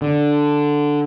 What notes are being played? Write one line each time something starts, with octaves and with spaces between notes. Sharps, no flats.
D3